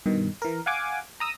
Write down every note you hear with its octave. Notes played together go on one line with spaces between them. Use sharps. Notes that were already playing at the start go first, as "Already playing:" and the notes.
G2 B2 D#3
E3 A#4
F5 F#5 G#5 D6
A#5 D#6 E6